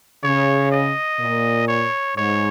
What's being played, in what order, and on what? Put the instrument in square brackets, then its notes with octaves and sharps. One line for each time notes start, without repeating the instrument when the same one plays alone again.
[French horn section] C#3 [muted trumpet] C#5
[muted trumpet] D#5
[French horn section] A#2
[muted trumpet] C#5
[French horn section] G#2 [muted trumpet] C#5